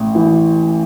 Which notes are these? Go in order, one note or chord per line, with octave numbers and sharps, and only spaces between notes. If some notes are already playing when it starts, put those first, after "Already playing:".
Already playing: A1
E3